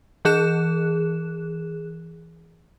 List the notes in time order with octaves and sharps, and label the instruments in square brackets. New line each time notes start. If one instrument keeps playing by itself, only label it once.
[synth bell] E3 G#4 F#6 E7